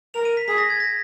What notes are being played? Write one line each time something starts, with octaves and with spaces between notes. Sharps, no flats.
A#4 F7
D#7
B6
G#4 B6
A#6
G#6
A#6